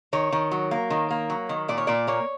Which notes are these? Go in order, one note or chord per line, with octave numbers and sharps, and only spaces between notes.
D#3 C#5
D#3
F#3
A#3
D#3
A#3
F#3
D#3
A#2 D5
C#5
A#2 D5
A#3 C#5